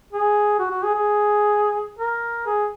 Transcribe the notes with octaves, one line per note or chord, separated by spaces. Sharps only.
G#4
F#4
F#4
G#4
G#4
A#4
G#4